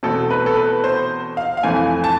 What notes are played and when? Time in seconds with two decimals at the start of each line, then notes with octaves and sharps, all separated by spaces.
0.03 E2 B2 A3 C4 A4
0.31 B4
0.46 A4
0.57 B4
0.84 C5
1.37 F5
1.57 F5
1.63 F2 E3 A3 C4 G#5
2.04 A5